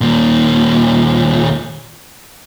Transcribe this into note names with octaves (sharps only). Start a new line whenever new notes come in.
D#2 A#2